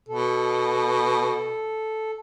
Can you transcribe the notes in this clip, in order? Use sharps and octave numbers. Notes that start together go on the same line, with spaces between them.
B2 A4